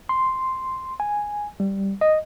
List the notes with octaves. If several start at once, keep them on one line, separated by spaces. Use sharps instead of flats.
C6
G#5
G3
D#5